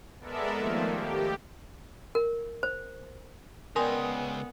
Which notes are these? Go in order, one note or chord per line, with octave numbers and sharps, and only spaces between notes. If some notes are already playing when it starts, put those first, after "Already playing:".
G#3 B3 A4 A#4 D5 E5
D#3 F3 A3 A#3
G4
A#4
C5
C#2 B3 A#4 D5 G5 G#5 C6 D#6